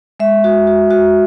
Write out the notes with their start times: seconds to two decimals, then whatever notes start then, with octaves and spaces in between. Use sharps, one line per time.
0.20 G#3 E5
0.44 F#4
0.67 F#4
0.91 F#4